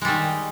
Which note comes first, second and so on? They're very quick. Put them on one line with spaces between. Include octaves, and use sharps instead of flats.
G#3 G3 D#3